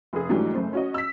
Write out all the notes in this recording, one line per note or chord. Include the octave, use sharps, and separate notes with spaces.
F1 G#4
G#2 E3 F#3 G3 A3 D4
F#1 A3 C5
C#4 F#4 D#5
E6 B6